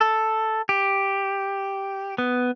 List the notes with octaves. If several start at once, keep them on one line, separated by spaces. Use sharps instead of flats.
A4
G4
B3